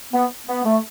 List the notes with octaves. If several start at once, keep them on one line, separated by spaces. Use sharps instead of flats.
B3
B3
A3